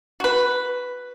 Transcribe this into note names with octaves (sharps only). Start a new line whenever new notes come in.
F#4 B4